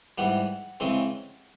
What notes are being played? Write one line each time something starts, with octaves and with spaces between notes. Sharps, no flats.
G#2 E3 G3 F#5
C#3 E3 G#3 C4